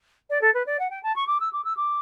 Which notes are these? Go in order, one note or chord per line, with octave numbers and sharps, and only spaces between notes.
D5
A4
B4
D5
F#5
G5
A5
C#6
D6
E6
D6
E6
D6